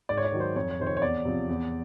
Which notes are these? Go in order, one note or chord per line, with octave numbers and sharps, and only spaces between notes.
G#2 D5
C#5
D5
D#3 F#3
C5
F2 C#5
C#5
C3 D#3 C5
C#5
C#5
E2 D5
C3 F3
E2